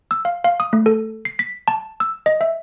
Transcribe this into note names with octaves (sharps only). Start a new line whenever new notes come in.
E6
F5
F5
D#6
A3
A4
C7
B6
A5
E6
D#5
E5